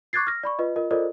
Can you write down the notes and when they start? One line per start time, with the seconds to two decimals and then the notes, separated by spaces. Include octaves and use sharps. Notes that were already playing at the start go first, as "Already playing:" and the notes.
0.13 C#6 D6 F#6 G#6 A6 C7
0.27 F6 A#6
0.43 D5 B5 C#6
0.59 F4 B4 D#5
0.76 F4 A#4 D#5
0.91 F4 A4 A#4 C5 D5 D#5